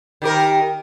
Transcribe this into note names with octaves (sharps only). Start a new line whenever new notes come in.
D#3 G4 A#4